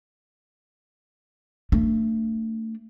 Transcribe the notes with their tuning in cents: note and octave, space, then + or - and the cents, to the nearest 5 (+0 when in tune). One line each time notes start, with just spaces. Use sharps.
A3 +25 D4 +0